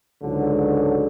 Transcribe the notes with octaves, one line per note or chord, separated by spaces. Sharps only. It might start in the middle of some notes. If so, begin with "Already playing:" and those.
C#2 G#2 D3 F#3